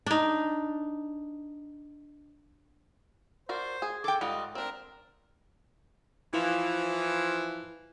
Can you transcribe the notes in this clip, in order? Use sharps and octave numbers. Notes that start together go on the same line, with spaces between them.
D4 D#4
F#4 A#4 C5 D5
G#4
A4 G5 D6
G#2 G3 F4 D#5 F#5
C4 D4 A#4
E3 F3 E4